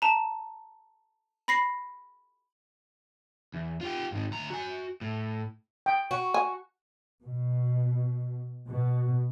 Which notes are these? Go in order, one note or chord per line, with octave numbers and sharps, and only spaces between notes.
A5 A#5
B5 A#6 C7
E2
F4 G4
G#2 D#3
D2 A#5
F#4 G#5
A2
G5
F#4
G#5
B2
B2